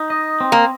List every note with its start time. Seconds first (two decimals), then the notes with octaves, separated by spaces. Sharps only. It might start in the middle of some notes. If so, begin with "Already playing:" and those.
Already playing: D#4
0.10 D#5
0.41 C4
0.52 A#3